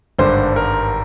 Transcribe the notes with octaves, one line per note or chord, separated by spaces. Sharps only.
G#1 G2 D3 C5
A#4